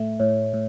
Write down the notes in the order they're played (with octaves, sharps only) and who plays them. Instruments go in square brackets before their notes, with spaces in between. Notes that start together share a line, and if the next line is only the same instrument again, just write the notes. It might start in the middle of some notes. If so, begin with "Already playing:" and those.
Already playing: [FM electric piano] A2 A3 [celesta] E5
[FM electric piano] A2 [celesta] C#5
[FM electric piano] A2